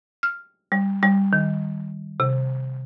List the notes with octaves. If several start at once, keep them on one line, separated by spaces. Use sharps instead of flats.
F6
G3
G3
D#3
C3